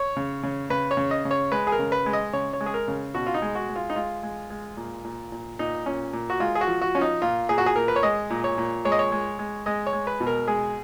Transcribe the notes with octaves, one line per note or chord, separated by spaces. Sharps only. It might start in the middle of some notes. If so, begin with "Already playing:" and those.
Already playing: C#5
C#3
C#3
C#3 B4
C#5
C#3
D#5
C#3
C#5
G#3 B4
G#4
A#4
C#3
B4
G#3
D#5
C#3 C#5
C#5
G#3
G#4
A#4
C#3
B2 F#4
F4
D#4
G#3
F#4
G#3
F4
D#4
G#3 F4
G#3
G#3
A#2
A#2
A#2
A#2 D#4
A#2 C#4
A#2
F#4
G#3 F4
G#4
F#4
F3
F#4
F3 C#4
D#4
A#2 F4
A#2 G#4
F#4
G#4
A#2 A#4
B4
C#5
G#3 D#5
A#2
C#5
A#2
G#3 C#5
D#5
C#5
G#3
G#3
G#3 D#5
C#5
G#3
B4
B2
A#4
G#3 G#4